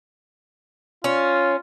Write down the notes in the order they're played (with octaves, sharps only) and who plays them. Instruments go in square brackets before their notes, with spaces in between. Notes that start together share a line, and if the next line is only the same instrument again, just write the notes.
[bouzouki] C#4 [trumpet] F4